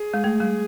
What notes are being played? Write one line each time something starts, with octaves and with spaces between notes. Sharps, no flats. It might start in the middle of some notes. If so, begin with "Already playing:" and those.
Already playing: G#4
G#3
A3
G3